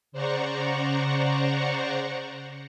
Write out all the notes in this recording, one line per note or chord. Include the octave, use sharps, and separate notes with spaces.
C#3 C5 D5 F#5 A#5 C#6